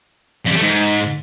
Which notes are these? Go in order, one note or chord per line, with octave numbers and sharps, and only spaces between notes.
F2
G3
A3
G#2